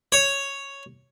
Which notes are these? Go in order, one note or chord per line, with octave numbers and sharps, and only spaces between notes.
C#5